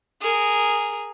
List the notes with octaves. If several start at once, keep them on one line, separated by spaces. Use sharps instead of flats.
G#4 A#4